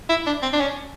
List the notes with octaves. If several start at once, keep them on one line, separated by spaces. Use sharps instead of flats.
E4
D4
C4
D4
C#4